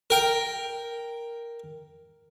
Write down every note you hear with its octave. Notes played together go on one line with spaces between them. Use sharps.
A#4 G5